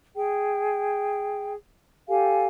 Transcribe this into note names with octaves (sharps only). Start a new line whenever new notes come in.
G#4 G5
G4 A4 F5 G#5